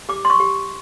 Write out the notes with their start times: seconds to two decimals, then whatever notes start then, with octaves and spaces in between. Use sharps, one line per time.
0.09 G4 D6
0.25 C6
0.30 C#6
0.40 G4